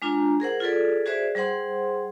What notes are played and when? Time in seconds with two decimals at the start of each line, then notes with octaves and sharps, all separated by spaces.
0.02 G#3 D4 F4 A#5
0.40 G#4 A#4 C5 F#5
0.60 F4 G#4 A4 B4 D5
1.06 F#4 G#4 B4 C5 D5 E5
1.35 G3 G#4 C5 F#5 C6